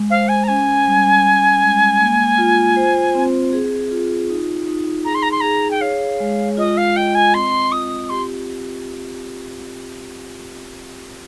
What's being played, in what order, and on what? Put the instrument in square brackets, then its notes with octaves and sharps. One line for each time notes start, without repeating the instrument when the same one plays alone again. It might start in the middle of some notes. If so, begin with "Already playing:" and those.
Already playing: [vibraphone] G#3
[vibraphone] C5 [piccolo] F5
[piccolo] G#5
A#5
[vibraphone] C#4 [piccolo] G#5
[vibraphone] G3
C#4
G#3
A#3
F4
C5
C4
G#4
F4
D#4
D#4
[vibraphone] G#4 [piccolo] A#5
[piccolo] C6
A#5
C6
[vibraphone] G#4 [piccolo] A#5
[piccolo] G5
[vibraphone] C#5 [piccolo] F5
[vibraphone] G#3
[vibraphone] F4 [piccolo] D#5
[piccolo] F5
[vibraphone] D#5 [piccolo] G5
[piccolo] G#5
[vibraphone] C4 [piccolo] C6
[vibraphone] F4 [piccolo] D#6
[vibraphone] G4 [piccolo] C6